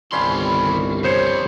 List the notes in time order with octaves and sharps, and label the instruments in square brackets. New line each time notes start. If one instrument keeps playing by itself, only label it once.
[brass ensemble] G1 C2 [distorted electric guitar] D#3 C6 [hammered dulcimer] G3 C#4 F5
[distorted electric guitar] F2 G#2 [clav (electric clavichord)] C5 C#5